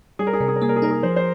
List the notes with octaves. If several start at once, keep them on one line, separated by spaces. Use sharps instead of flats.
G3 G#4
A#4
G#4
C3 A#4
G#4
A#4
A#3 G#4
A#4
G#4
D#4 A#4
G#4
F3 C5
C5